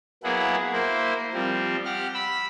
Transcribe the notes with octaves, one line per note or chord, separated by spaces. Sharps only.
F#3 A#3 B3 E4 G#4 F#5
A#3 E4 C5
F3 G3 C4
G4 F#5 F6
B5 E6